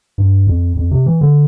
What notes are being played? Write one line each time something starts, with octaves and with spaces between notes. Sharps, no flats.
G2
F2
F2
C3
E3
D3